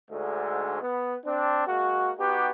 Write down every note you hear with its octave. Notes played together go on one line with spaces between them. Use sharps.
D2 G#2 D3 G#3 A3
B3
C4 D4
G#3 A#3 F#4
B3 D#4 F#4 G4